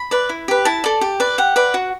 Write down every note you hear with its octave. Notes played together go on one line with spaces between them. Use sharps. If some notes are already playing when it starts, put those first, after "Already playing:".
Already playing: B5
B4 D5
E4
G4 B4
E4 A5
A4 D5
G4
B4 D5
G4 F#5
B4 D5
F#4